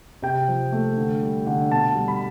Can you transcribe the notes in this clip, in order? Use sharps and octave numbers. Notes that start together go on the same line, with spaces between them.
C3 G5
F3
A3
D3
G3
D3
B2 A5
G3
B5